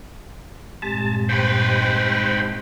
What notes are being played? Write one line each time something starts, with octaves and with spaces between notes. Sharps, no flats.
G2 A#2 G#3 C4 G4 A5
G#2 B4 C5 G5 B5